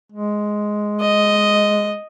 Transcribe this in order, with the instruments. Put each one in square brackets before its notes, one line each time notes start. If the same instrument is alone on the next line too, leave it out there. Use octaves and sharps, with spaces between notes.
[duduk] G#3
[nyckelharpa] D#5